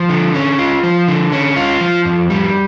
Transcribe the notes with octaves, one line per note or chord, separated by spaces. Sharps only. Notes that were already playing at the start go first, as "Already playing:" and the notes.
Already playing: F3
D3
C#4
F4
F3
D3
C#4
F4
F3
F2
G3